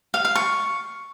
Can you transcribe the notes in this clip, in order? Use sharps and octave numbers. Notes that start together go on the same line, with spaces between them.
F5
F5
C#6